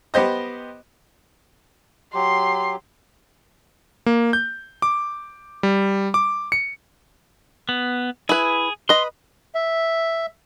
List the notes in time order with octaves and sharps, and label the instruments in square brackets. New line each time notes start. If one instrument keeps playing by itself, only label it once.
[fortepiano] B3 G4 C5 D#5
[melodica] F#3 G4 [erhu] C6
[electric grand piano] A#3
G6
D6
G3
D6
C#7
[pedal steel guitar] B3
[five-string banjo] E4 B4 [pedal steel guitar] G#4
[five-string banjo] B4 D#5 [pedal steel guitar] C6
[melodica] E5